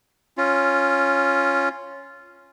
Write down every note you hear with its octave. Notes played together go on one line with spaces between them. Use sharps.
C#4 F4